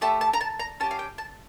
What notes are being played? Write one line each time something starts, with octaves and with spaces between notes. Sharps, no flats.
A3 E4 G4 A5
A5
A#5
A5
A#5
C#4 G4 A5
F5
G5
A5